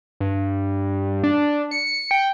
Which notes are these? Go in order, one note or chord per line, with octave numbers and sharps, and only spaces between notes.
G2
D4
C#7
G5